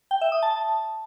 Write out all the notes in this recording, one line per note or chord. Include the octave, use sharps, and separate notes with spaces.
G5
E5
D#6
A5